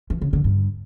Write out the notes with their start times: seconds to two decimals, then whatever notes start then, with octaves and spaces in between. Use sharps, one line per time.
0.10 E3
0.21 C#3
0.33 D3
0.44 G2